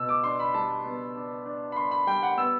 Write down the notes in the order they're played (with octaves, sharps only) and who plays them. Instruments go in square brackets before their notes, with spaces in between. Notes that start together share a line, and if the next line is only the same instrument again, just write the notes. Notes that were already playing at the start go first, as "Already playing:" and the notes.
Already playing: [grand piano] B2 E6
D6
D4 C6
B5
G3 A5
B3
D4
D4
B5
D4 C6
B5
G3 G5
F#5
B3 E6